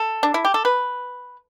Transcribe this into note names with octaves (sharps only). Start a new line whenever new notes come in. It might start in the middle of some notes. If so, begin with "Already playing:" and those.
Already playing: A4
D4
E4
G4
A4
B4